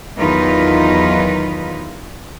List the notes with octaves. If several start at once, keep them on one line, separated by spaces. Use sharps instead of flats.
E2 D#3 F#3 D#4 F4 B4